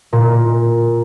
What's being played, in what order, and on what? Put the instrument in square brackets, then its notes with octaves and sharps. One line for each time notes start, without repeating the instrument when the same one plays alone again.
[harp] A#2